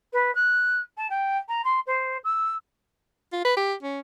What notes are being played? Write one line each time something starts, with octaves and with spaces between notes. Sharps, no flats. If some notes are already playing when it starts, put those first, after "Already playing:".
B4
F#6
A5
G5
A#5
C6
C5
E6
F4
B4
G4
C#4